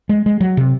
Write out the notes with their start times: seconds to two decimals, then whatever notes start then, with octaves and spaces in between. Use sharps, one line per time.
0.09 G#3
0.26 G#3
0.41 F#3
0.57 C3